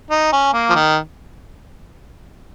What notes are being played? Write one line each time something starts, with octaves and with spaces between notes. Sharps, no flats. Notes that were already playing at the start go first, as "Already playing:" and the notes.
D#4
C#4
A#3
F3
D#3